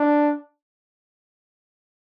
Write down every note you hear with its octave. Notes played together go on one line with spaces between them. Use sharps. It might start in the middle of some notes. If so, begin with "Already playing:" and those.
Already playing: D4